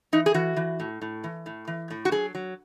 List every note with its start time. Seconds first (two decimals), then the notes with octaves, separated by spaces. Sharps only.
0.13 E3 D#4
0.26 G#4
0.34 E3 F#4
0.56 E3
0.80 A2
1.02 A2
1.24 E3
1.46 A2
1.67 E3
1.90 A2
2.05 F#4
2.12 F#3 G#4
2.35 F#3